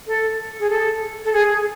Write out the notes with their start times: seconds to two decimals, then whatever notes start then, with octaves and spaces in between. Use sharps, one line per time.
0.07 A4
0.60 G#4
0.70 A4
1.25 A4
1.33 G#4